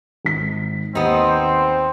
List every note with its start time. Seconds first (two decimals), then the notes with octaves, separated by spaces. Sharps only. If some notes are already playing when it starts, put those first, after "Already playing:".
0.25 G#1 B6
0.95 D#2 B3 C4 D#4 C5